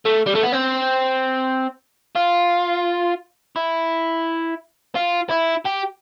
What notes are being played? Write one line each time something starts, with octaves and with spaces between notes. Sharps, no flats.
A3
G3
A3
B3
C4
F4
E4
F4
E4
G4